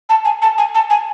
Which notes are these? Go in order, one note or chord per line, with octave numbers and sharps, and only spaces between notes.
A5
G#5
A5
G#5
A5
G#5